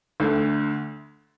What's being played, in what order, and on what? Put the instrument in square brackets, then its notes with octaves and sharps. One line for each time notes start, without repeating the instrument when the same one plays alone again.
[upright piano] D2 D3 A3